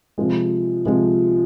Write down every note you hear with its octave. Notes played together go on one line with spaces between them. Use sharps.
C3 F3 G#3
C3 F3 G#3